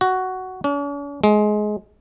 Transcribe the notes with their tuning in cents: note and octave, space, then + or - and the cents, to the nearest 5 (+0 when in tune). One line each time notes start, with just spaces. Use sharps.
F#4 +10
C#4 +45
G#3 +20